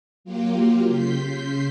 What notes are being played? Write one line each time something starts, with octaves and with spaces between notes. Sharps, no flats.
F#3 A#3 F4 G4
C#3 C6 G6 B6 C7